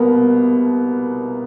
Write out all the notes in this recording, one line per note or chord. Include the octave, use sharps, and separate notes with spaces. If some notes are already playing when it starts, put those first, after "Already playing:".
Already playing: C2 B2 A#3 B3